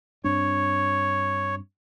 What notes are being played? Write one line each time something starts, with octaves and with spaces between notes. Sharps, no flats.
G2 C4 D4 C#5